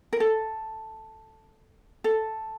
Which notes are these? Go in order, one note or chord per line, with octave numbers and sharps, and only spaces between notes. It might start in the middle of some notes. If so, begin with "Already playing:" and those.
A#4
A4
A4